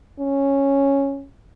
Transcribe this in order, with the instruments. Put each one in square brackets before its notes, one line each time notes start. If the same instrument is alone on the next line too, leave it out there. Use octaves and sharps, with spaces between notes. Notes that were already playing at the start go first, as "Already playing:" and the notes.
[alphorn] C#4